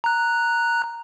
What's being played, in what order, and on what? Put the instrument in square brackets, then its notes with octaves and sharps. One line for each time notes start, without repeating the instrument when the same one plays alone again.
[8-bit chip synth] A#5 F#6